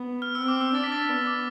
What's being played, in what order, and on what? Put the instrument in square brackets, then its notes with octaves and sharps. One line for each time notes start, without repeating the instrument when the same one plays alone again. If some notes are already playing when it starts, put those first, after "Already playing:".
Already playing: [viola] B3
[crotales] F6
[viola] C4 [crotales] E6
[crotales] D6
E6
[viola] D4 [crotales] A6
[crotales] B6
A6
[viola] B3
[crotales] D6